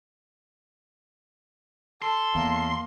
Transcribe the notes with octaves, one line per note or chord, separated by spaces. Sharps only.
A4 C6
E2 A#3